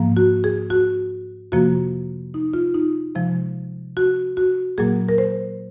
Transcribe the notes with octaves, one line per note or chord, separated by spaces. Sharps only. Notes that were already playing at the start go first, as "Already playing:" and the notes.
Already playing: G#2 F3 A#3
F#4
G#4
F#4
F2 C3 F3 A#3 F#4
D#4
F4
D#4
C3 F3 G#3
F#4
F#4
A#2 F#3 A#3 G#4
A#4
C5